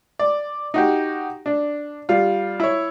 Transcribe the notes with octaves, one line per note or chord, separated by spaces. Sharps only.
D5
D#4 F#4 G4
D4
G3 F4
E4 C#5